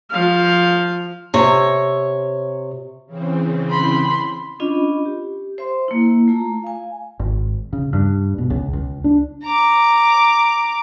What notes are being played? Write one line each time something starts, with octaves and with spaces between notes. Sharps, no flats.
F3 F5
C3 C#5
C#3 E3 C4
B5 C6
C#4 D4 F4 D#5 B5
G4
C5 E5 C6
A#3 E4
A3 F4 A#5
F5 G#5
G#1
C#3
G2
B2
C#2
C#2
D4
A#5 D6